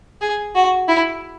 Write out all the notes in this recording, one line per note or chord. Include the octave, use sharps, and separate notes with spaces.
G#4
F#4
E4